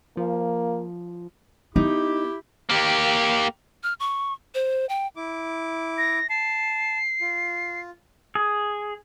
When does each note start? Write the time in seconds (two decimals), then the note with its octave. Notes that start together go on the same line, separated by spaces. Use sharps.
0.17 F3 A#3
1.76 B3 D#4 E4 G4
2.69 A#3 G4
3.83 F6
4.00 C#6
4.55 C5
4.89 G5
5.16 E4 D6
5.98 A#6
6.30 A5 C7
7.21 F4
8.35 G#4